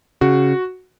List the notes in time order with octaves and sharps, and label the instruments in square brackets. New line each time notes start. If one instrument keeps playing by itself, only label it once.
[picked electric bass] C#3 [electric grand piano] F#4